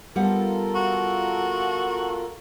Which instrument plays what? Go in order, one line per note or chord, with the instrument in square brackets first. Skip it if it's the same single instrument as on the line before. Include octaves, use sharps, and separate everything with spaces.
[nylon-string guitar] G3 B3 F#5 [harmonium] F4 A4 A#4
[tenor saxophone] F#4